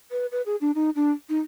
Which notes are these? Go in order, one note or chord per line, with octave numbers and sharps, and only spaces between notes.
B4
B4
G#4
D4
D#4
D4
D#4